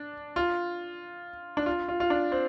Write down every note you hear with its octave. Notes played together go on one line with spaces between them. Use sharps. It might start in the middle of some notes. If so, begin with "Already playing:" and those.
Already playing: D4
F4
D4
F4
F4
F4
D4
C4